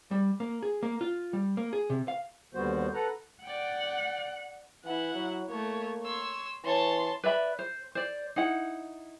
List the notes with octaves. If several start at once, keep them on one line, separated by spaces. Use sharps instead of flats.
G3
A#3
G#4
A#3
F4
G3
A#3
G#4
C3
F5
D#2 D3 G3 B3 F#4 C5
A4 B4 F#5 A#5
D5 F#5 G5
E3 E4 F#5
F#3
A3 A#3 C#5
C#5 C6 E6
E3 C#5 A5 C6
B4 D5 E5 B5
C5
C5 D5
D#4 E4 F#5